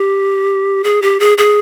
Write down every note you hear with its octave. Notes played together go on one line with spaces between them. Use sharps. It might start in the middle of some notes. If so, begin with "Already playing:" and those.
Already playing: G4
G#4
G4
G#4
G#4